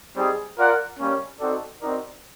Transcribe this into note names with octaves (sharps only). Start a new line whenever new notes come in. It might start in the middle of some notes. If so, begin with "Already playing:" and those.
G3 C4 D#4 G#4
F4 A#4 D5 F#5
G3 A#3 C#4
C4 D#4 F#4 A4 D5
C4 D#4 F#4 A#4 D5